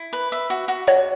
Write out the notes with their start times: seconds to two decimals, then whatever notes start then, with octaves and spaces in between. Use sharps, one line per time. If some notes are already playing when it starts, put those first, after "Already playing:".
Already playing: E4
0.13 B4
0.32 E5
0.50 F#4
0.68 F#4
0.87 F#4 C#5